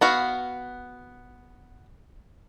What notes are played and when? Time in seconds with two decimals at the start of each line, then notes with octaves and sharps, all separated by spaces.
0.01 B3 F#4 F5